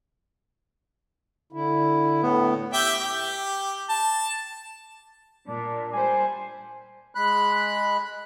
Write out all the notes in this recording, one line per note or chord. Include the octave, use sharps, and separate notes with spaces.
D3 E4
A2 B3
G4 E5 G5
G4
A5
A#2 D4
G3 C5 G#5
G#3 B5 F#6